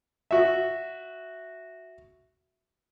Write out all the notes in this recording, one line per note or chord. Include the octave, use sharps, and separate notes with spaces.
F#4 E5